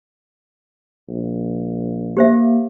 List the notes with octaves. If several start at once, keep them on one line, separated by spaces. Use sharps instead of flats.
A#1
A#3 G4 C5 E5